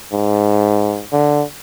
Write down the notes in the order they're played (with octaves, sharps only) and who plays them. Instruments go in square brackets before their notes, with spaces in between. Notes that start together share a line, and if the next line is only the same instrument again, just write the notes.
[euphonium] G#2
D3